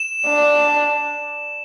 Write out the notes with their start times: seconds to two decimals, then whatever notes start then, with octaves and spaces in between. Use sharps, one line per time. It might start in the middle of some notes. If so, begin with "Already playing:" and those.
Already playing: E7
0.28 D4